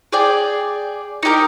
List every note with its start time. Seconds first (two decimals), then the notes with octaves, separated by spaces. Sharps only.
0.13 G#4 D5 G5
1.23 D#4 G4 A#4